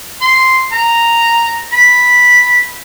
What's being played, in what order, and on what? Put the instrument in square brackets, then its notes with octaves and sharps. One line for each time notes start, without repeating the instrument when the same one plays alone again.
[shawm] C6
A#5
B5